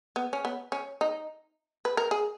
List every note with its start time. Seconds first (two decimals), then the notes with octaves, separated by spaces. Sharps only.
0.16 B3
0.33 C#4
0.45 B3
0.72 C#4
1.01 D#4
1.85 B4
1.97 A#4
2.11 G#4